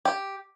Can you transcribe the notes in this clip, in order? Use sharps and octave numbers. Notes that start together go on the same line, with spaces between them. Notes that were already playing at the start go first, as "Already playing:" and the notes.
G4